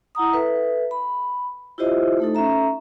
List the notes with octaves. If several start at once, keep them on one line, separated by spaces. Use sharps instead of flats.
E4 F#5 A#5 D#6
A4 B4 E5
B5
E4 F4 G4 C5 D#5 E5
A3 D#4 A4
C#4 A4 E5 A#5